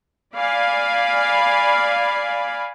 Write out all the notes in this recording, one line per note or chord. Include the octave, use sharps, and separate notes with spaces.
D5 F5 G#5 B5